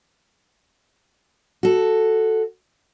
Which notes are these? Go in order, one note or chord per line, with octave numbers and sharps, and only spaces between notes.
F#4 A4